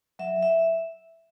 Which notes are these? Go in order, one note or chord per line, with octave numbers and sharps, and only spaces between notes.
F#3 E5
E5